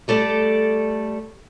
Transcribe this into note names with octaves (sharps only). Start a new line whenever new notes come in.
G3 A3 A4 D5